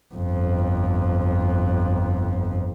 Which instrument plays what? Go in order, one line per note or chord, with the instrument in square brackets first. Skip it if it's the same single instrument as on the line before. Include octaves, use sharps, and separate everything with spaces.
[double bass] G1 F2